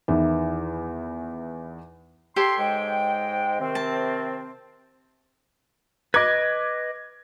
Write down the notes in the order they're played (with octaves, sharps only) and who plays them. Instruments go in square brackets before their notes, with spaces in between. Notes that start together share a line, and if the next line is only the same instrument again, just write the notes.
[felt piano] E2 D#3 E3
[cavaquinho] G4 A4 C#5 [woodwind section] C6
[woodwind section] G#2 G#3 G5
C3 D#3 C4
[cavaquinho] A5
[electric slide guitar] B4 D#5 [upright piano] D6 G#6